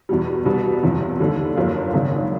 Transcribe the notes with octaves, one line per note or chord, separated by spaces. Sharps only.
E2 B2 G3
C2 B2 G3 B3
F#1 E2 C3 F3
D#2 D3 G3
G1 F#2 D3 F3 A#3
G#1 F#2 C#3